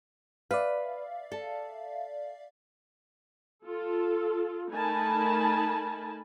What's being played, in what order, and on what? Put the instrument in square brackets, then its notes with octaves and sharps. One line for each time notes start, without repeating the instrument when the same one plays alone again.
[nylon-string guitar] B4 [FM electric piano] D5 E5 F5
[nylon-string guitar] A4
[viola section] F4 A4
A3 D#4 A#4 G#5 A5 B5